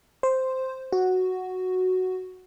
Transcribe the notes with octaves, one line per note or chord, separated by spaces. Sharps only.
C5
F#4